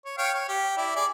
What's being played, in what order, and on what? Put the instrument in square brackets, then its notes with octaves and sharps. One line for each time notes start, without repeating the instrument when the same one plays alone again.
[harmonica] C#5
C#5 F5 G5
C#5
G4
E4 D5
G#4 D5